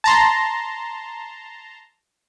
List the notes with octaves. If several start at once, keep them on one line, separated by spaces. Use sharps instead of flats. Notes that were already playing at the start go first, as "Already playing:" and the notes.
A5 A#5 C6